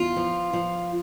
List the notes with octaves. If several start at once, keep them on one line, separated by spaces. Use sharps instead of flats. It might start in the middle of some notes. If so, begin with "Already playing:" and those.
Already playing: E2 F4
F3
F3